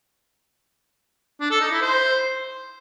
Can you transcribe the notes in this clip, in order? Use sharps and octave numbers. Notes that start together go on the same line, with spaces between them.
D4
A4
D#4
E4
C5